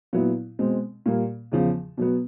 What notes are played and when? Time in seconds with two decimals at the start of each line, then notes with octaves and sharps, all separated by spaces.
0.13 A#2 F#3 B3 E4
0.59 B2 G#3 C4
1.06 A#2 G3 A#3
1.52 E2 C#3 F3
1.98 B2 F#3 B3